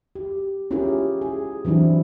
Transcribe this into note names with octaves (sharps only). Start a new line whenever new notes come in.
G4
C#4 E4 F4 G4 G#4 A#4
G#4
E3 F#3 C4 D4 E4